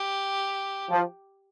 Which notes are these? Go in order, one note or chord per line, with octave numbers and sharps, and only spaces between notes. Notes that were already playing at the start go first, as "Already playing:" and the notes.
Already playing: G4
F3